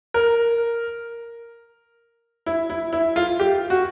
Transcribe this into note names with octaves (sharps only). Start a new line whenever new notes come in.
A#4
E4
E4
E4
F4
G4
F#4